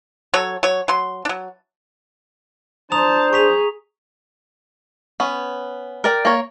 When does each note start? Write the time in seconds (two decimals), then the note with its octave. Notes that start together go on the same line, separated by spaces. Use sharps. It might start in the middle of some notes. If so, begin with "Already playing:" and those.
0.34 F#3 A4 C#5
0.63 F#3 C#5
0.88 F#3 C6
1.25 F#3 D4
2.92 D4 C5 A5 A#5 D#6 F7
3.33 G#4 C#6 B6 F7
5.20 B3 C#4
6.04 A#4 D5 G5
6.25 A#3 C#5